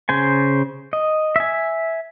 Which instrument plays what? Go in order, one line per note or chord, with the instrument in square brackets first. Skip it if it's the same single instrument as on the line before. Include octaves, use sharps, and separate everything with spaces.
[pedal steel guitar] C#3 C5 G#5
D#5
E5 G#5